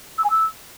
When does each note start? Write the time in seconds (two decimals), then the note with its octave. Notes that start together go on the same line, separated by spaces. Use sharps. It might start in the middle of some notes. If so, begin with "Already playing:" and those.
0.18 E6
0.24 G#5
0.30 E6